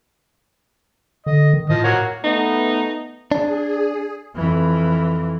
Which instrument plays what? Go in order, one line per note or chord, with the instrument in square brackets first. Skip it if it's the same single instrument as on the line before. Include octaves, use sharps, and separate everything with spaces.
[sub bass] D3 [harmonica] D#5
[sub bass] D#3
[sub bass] A2 [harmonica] F3 D#5
[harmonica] A#3 F#4 C#5
[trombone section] A3 B3 [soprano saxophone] D#4
[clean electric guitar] D4 [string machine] G#4
[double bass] F2 E3